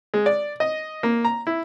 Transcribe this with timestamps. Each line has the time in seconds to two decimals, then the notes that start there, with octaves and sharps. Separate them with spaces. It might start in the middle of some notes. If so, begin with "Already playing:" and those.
0.14 G#3
0.26 D5
0.60 D#5
1.03 A#3
1.25 A#5
1.47 E4